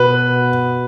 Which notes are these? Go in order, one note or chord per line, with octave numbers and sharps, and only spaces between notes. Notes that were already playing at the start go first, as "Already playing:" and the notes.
Already playing: B2 B3 B4